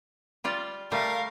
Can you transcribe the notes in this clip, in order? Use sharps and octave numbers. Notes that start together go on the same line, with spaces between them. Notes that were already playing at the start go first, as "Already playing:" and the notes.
G3 F4 D5
G3 A3 A#4 F5